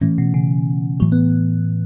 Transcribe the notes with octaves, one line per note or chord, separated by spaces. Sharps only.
A2 E3 A3 C#4
B2
C#3
A2 E3 F#3 A3
B3